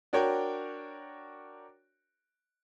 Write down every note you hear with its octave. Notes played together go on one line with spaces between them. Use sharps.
D4 F#4 A#4 C#5 G5